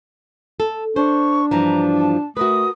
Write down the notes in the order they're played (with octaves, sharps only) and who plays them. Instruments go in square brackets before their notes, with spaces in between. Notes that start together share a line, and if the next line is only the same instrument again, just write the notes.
[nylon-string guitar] A4
[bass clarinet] D4 [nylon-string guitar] C5 [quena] C#6
[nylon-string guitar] G2 E3 F3 [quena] A#5
[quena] A5
[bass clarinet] A3 [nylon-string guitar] F#4 A#4 B4 [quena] D#6